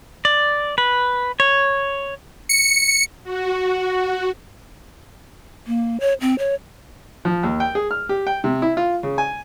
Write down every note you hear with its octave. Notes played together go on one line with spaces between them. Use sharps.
D5
B4
C#5
C#7
F#4
A#3
C#5
C4
C#5
F3
D#2
G5
G#4
F6
G4
G5
C3
E4
F4
C#3
G#5